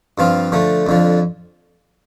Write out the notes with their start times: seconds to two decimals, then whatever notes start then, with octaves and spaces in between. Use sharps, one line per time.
0.18 G2 F3 C4 F4
0.52 D3 F3 A3
0.87 F2 D3 F3